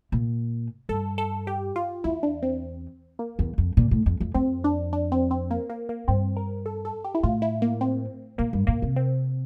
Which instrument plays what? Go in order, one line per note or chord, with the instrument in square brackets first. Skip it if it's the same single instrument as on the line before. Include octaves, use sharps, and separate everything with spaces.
[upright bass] A#2
[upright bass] G2 [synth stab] A4
[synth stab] A4
G4
F4
[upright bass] E2 [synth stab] E4
[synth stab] D4
C4
A#3
[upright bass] E2
F2
A#2
A2
F2
F2
[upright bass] F2 [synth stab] C4
[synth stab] D4
D4
C4
C4
A#3
A#3
A#3
[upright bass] G2 [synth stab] C4
[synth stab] A#4
A4
A4
G4
E4
[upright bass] A2 [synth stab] F4
[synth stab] E4
A#3
C4
[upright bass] A#2 [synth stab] A#3
[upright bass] G2
[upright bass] A#2 [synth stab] A#3
[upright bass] C3
[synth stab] C4